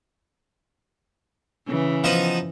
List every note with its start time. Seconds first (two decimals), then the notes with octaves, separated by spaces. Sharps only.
1.67 C#3 E3
2.04 F3 B3 D#4